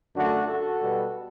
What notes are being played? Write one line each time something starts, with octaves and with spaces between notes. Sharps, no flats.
F#2 D3 A3 D4 F#4
F#4 A4
B2 G3 B3